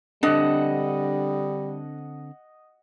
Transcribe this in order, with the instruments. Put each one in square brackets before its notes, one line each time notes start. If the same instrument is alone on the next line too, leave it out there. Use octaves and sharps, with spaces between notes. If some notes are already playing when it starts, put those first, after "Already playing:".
[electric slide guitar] D3 C4 A4 [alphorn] G3 [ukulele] D4 [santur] D#5 F#5